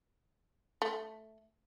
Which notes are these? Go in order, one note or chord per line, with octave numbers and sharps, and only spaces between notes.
A3